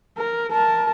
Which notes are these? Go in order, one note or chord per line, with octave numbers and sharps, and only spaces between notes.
A#4
A#4 A5